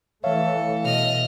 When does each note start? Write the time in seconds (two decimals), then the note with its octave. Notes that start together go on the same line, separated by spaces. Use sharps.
0.24 E3 A3 A4 C#5 E5 F5
0.85 B2 D#5 F6